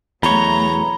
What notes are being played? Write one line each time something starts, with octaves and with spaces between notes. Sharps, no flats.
E2 B2 F#3 A3 C#5 A#5 B5 G7